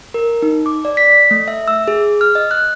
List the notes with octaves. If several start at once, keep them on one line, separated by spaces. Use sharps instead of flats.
A#4
D#4
D6
D5
B6
A3
E5
E6
G#4
F6
D#5
F#6